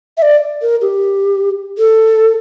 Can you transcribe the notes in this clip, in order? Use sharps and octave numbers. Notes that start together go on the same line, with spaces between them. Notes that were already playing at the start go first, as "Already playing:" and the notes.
E5
D5
A#4
G4
A4